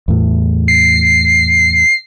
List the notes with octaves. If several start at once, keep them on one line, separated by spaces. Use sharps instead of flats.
E2 A2
C7